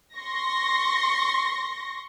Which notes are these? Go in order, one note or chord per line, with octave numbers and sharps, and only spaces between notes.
C6 C#6 A#6